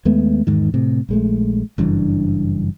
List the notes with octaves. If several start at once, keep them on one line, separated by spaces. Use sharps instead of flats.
D#2 G#3 A3 B3
E2 G#2 D#3
A2 C3
A#1 G#3 A3
F#1 G2 E3 D4